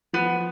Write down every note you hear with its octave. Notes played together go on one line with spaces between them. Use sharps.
F3 B3